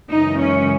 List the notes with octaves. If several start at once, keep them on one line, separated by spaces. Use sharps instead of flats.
F#2 C#3 E3 G#3 D#4
C#4